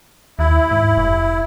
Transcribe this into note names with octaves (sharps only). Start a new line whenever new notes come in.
D#2 E4
G#2
F1